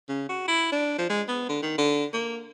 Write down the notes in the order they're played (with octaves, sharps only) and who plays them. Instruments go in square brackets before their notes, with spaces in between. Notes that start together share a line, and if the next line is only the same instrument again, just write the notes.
[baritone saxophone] C#3
F#4
E4
D4
F3
G#3
B3
D3
D#3
D3
A#3